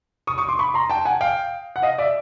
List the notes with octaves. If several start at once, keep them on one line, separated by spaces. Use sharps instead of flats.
C#6 D#6
C#6 D#6
C6 D6
B5 C#6
A#5 C6
G5 A5
F#5 G#5
F5 G5
F#5
D#5 F5
D5 E5